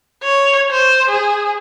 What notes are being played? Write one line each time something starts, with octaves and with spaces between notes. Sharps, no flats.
C#5
C5
G#4